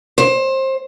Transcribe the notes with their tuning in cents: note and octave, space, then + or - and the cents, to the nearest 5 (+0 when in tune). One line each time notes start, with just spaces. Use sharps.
C5 +25